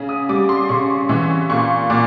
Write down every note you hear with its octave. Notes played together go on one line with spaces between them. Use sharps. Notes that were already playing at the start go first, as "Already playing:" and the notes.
Already playing: C#3
D#6
G3 D6
C6
C#3 C#6
E3 C#6
A#2 C#6
A#2 D6